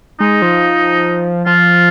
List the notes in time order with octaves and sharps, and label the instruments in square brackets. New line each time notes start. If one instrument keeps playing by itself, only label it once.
[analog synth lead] G#3 [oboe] D#4
[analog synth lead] F3
[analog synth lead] F3 [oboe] F4